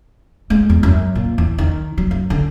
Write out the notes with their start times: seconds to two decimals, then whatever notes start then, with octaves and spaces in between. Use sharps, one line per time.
0.50 G#3
0.69 E2
0.83 F#2
1.15 A#2
1.38 E2
1.58 D#3
1.98 F#3
2.11 F#2
2.30 D3